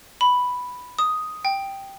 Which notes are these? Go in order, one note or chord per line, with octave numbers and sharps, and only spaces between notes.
B5
D#6
G5